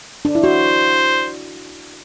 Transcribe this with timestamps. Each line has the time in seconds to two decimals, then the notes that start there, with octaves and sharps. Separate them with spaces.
0.25 D4
0.35 E4
0.44 F#4 C5